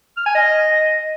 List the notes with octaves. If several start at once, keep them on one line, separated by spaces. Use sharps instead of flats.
F6
G#5
D#5